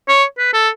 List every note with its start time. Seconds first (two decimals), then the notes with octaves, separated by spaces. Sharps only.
0.08 C#5
0.39 B4
0.54 A4